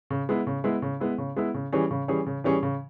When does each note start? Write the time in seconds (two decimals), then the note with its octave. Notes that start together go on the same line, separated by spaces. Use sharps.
0.10 C#3
0.29 G#3 B3 E4
0.47 C#3
0.64 G#3 B3 E4
0.82 C#3
1.00 G#3 B3 E4
1.18 C#3
1.36 G#3 B3 E4
1.54 C#3
1.73 E3 G3 C#4 G#4
1.91 C#3
2.08 E3 G3 C#4 G#4
2.27 C#3
2.44 E3 G3 C#4 G#4
2.63 C#3